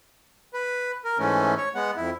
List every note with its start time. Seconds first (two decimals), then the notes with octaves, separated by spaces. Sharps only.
0.54 B4
1.05 A#4
1.19 G#2 E3 A3 C#4
1.57 C#5
1.75 G#3 B3 F#5
1.97 F2 E4